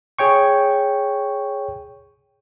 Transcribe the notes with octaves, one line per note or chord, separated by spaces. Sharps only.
G#4 C#5 G5 C#6